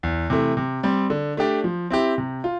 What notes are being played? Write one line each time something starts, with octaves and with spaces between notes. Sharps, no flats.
E2
C3 E3 A3
C3
G3 C4
D3
A3 D4 G4 D5
F3
C4 E4 G4
C3
F4